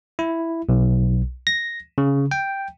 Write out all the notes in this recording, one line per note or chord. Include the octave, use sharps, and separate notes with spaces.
E4
B1
A#6
C#3
G5